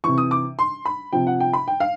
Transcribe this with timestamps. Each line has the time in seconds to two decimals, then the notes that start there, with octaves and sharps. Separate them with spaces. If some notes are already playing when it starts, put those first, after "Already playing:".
0.04 C3 E3 C#6
0.18 D#6
0.31 D6
0.59 C6
0.85 B5
1.13 C3 F3 G5
1.27 F#5
1.40 G5
1.53 B5
1.68 G5
1.80 F5